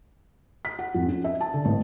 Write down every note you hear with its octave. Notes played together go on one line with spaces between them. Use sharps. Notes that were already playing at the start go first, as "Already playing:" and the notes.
B6
F#5
F2
C#4
E5
A5
D3
A1